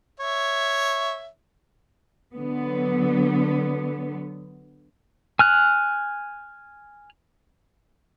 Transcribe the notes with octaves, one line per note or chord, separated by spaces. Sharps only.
C#5 E5
D3 F#3 B3
G#5 F6 F#6